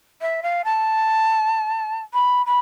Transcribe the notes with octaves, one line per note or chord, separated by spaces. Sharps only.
E5
F5
A5
B5
B5